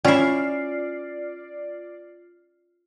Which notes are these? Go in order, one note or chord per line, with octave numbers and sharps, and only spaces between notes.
C#4 E4 F4 D5 F6 C7